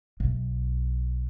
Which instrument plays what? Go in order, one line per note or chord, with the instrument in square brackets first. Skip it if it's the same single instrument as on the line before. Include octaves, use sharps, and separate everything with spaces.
[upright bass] B1